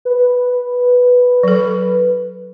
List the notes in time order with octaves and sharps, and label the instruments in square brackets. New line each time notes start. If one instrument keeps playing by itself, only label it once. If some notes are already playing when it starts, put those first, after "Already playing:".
[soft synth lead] B4
[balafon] F#3 A4